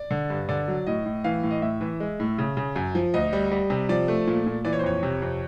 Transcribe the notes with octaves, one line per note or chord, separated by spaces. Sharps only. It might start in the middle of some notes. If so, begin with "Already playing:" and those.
Already playing: D5
D3
G2
D3 D5
F#3
A2 D#5
A2
E3 F5
A2
D#5
A2 E5
E3
G#3
A2
C#3
C#3
F#2
F3
D2 D#5
G3
G3
C3
F3 D5
A3
A#2
A#2
E3 D5
C#5
C5
F2 C#5
C3
F2